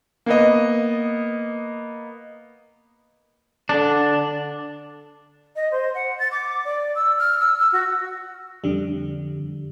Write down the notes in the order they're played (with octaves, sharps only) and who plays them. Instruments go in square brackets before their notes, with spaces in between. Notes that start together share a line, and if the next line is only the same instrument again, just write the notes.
[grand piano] A#3 B3 D#5
[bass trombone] D3 [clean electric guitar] D4
[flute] D#5
C5
F#5
A6
D6
D5
E6
F6
E6
E6
F#4
[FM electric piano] F2 D3 G3